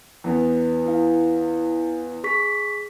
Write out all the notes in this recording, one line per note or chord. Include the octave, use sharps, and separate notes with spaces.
E2 B3
E4 F5
G#4 C#6 B6